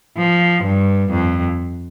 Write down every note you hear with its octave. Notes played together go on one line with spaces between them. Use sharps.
F3
G2
F2